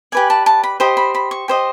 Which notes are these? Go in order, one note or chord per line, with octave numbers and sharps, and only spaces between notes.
G4 B4 D5 G#5
A5
A5
B5
G4 C5 D#5 B5
B5
B5
C#6
G4 C5 D#5